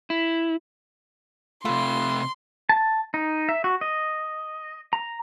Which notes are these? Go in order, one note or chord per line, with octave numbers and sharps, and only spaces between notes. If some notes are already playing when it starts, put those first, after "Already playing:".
E4
C3 A3 F4 B4 C6
A5
D#4
E5
F#4
D#5
A#5